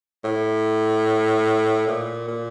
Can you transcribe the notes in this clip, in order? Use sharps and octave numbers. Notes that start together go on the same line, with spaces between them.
A2
A#2
A#2